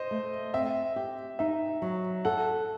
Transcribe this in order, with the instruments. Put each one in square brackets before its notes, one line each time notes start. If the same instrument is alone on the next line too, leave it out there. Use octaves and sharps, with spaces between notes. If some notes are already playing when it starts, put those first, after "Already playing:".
Already playing: [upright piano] C5 D#5
[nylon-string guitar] A3
[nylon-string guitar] C4 [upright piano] E5
[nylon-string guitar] G4
[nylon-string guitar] D#4 [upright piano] E5
[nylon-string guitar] F#3
[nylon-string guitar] A4 [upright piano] F#5